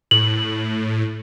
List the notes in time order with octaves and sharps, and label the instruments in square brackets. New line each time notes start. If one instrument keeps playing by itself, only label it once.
[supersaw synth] A2 [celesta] F#7